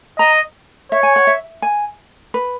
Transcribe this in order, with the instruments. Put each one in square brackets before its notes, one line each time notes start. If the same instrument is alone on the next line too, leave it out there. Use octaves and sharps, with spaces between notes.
[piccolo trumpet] D#5 [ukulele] A#5
[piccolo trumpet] C#5 [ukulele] E5
[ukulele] G#5
F#5
E5
G#5
B4